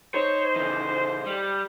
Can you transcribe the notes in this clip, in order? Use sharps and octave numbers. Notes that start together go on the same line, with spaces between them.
D#4 C5 C#5
C#3 E3
G3